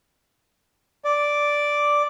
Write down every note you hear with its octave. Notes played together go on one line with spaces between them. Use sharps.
D5